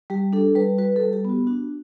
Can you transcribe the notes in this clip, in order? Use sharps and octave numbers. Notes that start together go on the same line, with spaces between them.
G3 G4
D4 A4
G3 B4
F#4 B4
G3 A4
G4
B3 F#4
D4 F#4